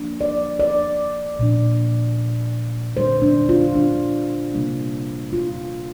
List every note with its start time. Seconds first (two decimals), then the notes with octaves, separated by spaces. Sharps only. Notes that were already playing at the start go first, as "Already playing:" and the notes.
Already playing: F3 A#3 D4
0.21 D5
0.60 D5
1.39 A#2 F3 D4
2.96 D3 G3 D4 C5
3.22 D4
3.49 F4
3.75 D4
4.54 C3 G3 A#3 D4
5.33 F4